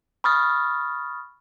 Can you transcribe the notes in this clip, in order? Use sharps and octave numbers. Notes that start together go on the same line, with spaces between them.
B5 C#6 D#6 F6 A6